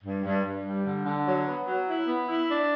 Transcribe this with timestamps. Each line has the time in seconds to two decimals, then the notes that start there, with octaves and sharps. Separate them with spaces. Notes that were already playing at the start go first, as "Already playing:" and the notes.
0.04 G2
0.25 G2
0.44 G2
0.65 G3
0.86 D3
1.06 D3
1.27 F#3
1.47 B3
1.67 F#3
1.88 E4
2.07 B3
2.28 E4
2.49 D4